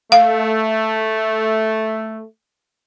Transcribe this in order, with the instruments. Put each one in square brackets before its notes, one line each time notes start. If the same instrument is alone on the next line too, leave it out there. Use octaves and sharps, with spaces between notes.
[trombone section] A3 [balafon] F5